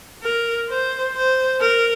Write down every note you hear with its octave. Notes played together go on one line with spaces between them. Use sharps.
A#4
C5
C5
A#4